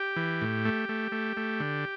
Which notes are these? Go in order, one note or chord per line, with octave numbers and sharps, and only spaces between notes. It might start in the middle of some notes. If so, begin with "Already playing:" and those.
Already playing: G4
E3
A2
A3
A3
A3
A3
D3